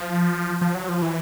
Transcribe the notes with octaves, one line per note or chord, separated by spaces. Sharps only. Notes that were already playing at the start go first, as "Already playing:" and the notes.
Already playing: F3
F3
F#3
F3
E3